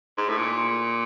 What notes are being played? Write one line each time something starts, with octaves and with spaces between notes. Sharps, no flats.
G#2
A2
A#2